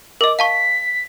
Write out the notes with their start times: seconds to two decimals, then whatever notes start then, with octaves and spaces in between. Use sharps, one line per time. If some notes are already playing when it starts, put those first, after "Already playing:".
0.21 A#4 D#5 D6
0.39 F5 A5 C#6 B6